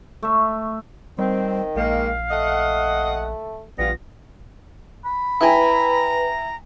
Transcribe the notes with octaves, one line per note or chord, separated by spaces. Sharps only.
A3 E5
D#3 G3 C4
A#1 G#3 A#3 F5
A3 D#5 F#5
A#1 G3 B3 F4 A#6
B5
E4 B4 G5 G#5 A#5